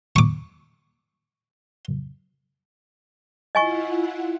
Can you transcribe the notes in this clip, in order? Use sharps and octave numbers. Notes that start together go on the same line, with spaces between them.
C#6 D6
E4 F4 D#5 F#5 G#5 C#6